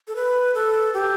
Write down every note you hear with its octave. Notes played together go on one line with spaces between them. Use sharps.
A4
B4
A4
G4